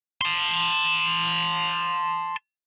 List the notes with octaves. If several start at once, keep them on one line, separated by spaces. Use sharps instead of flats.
A5 C6